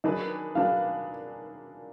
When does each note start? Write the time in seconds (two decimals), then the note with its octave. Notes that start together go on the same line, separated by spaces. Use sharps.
0.04 D#3 F#3 D4 G#4 B4 D#5
0.55 D#3 F#3 D4 G#4 B4 F5